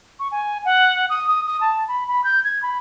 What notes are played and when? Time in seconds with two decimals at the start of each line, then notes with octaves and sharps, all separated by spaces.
0.19 C#6
0.31 G#5
0.65 F#5
1.09 D#6
1.28 D#6
1.47 D#6
1.61 A5
1.88 B5
2.08 B5
2.24 G6
2.44 G#6
2.62 B5